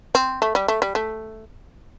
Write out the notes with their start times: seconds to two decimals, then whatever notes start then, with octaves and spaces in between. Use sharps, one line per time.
0.15 C4
0.42 A3
0.55 G3
0.68 A3
0.82 G3
0.95 A3